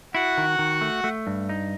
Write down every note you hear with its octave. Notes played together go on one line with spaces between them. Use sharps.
E4 F#4 F#5
D#3
D#3
A3
A3
G2
D#4